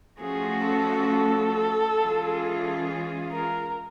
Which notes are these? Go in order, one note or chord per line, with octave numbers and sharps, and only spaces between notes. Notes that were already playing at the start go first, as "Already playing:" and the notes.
F3 A3 C#4 F#4 G#4
A4
A4
E3 G#3 C#4 F4 G#4
A#4